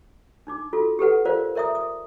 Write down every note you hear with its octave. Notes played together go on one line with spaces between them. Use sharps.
D4 D#4 D6
F4 F#4 A4
G4 A4 B4 F#5
F4 A#4 C5 D5 F5
A#4 D5 E5 A#5 D#6
D#6